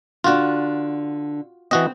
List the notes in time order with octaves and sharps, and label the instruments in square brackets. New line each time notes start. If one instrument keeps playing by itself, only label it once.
[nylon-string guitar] D3 D4 [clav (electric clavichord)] F4 F#4
[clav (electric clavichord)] E3 F#4 D#5 [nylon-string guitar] C4